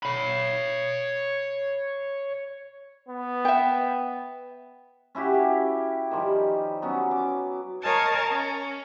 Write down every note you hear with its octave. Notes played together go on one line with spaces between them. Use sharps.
C#5 B5
B3
E5 G5
C#4 E4 F#4 G4
G4
D#3 F3 G3
F#3 B3 C#4
D6
A#4 C#5 D#5 F5 G#5 A5
C#4